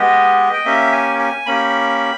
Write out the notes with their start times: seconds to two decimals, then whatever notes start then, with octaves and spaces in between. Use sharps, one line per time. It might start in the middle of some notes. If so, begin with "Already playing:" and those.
Already playing: G#3 B3 G4 D#5
0.53 G5
0.65 A#3 C#4 G4 E5
0.92 G#5
1.19 G#5
1.46 A#3 C#4 G4 B5